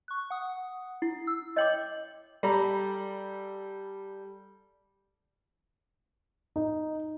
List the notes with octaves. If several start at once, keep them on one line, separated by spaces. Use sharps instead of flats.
C#6 F#6
F#5 D#6
E4 C7
E6
C#5 D#5 G5 D6 G6 F#7
G3 A4 A#5 B5
D#4